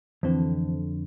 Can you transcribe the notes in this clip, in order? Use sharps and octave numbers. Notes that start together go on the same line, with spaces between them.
F2 D3 E3 C4